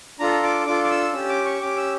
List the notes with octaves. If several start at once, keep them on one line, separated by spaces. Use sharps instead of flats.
D4 F4 A4 A#5
D6
D4 F4 A4 D6
D6
E6
C#4 G4 E6
D6
C#6
C#4 G4 D6
E6